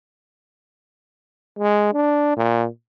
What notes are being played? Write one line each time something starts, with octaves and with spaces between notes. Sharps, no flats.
G#3
D4
A#2